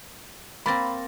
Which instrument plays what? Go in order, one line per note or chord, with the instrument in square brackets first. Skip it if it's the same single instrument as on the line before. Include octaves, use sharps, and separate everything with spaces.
[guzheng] A#3 C4 [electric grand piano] B5 A6 A#6